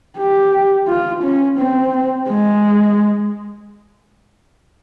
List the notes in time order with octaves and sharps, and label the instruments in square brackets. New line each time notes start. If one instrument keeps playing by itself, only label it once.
[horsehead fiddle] G4
F4
C#4
C4
G#3